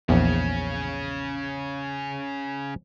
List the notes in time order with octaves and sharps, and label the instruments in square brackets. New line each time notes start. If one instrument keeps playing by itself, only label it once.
[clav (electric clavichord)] A#1 E2 [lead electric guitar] C#3 C#4